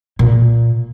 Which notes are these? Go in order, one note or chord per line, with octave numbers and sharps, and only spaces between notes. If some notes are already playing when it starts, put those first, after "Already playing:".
A#2